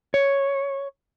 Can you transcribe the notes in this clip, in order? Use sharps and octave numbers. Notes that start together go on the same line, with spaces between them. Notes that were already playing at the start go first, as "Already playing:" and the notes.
C#5